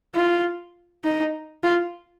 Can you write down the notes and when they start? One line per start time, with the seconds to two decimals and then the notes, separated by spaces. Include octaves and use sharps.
0.15 F4
1.04 D#4
1.64 F4